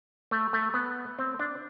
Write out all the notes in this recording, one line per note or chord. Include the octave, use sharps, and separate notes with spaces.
A3
A3
B3
C4
D4